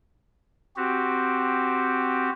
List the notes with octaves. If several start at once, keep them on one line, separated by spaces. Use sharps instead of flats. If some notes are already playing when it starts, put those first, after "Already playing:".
C4 F#4 G4